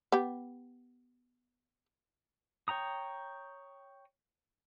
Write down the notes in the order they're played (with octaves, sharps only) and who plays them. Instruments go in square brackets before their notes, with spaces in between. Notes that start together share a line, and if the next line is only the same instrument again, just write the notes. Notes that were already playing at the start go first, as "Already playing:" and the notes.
[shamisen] B3 G4
[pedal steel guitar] C#5 G5 A#5 D#6